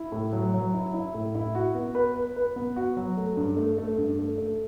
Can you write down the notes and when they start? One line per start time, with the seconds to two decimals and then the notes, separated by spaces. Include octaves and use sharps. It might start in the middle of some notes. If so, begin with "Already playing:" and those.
Already playing: E4
0.12 A2
0.33 F#3
0.54 F#3
0.74 E4
0.94 E4
1.14 A2
1.35 E4
1.55 F#4
1.75 B3
1.95 B4
2.15 B4
2.36 B4
2.56 B3
2.76 F#4
2.97 F#3
3.17 A3
3.37 G2
3.57 A3
3.78 A3
3.97 G2
4.19 A3
4.38 A3